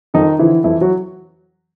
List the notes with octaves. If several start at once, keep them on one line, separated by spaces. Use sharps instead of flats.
F2 D#3 D#4
D3 E3 F3 E4
F2 E3 E4
F#3 F#4